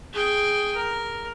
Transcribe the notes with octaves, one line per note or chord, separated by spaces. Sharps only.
G#4 G5
A#4